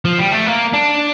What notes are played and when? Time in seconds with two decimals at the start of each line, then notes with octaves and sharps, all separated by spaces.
0.05 F3
0.18 G3
0.32 A3
0.46 A#3
0.73 D4